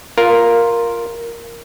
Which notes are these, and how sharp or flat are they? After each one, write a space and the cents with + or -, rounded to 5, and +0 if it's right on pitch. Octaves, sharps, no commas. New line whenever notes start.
F4 +0 A#4 +0